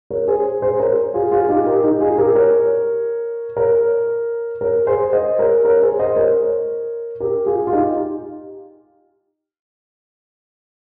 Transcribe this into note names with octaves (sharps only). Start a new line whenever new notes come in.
A#4 C#5
G#4 C5
G#4 C5
A#4 C#5
F4 G#4
F4 G#4
D#4 G4
G4 A#4
D#4 G4
F4 G#4
G4 A#4
A#4 C#5
A#4 C#5
A#4 C#5
G#4 C5
C5 D#5
A#4 C#5
A#4 C#5
G#4 C5
C5 D#5
A#4 C#5
G4 A#4
F4 G#4
F4
D#4 G4